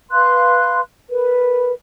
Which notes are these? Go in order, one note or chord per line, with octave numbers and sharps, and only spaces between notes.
B4 F5 C6 F#6
A#4 B4